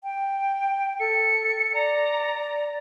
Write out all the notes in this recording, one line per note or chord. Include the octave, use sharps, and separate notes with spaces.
G5
A4 C#7
D5 A#5